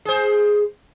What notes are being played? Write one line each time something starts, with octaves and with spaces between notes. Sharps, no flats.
G#4 C5